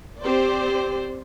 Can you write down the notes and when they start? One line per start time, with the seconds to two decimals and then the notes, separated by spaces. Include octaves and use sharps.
0.20 C4 G4 C5 D5